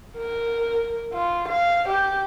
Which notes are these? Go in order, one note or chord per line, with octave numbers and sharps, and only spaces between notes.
A#4
F4
F5
G4